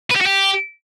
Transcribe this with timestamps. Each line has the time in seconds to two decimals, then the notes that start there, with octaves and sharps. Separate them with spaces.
0.10 B4
0.15 G4
0.21 F#4
0.26 G4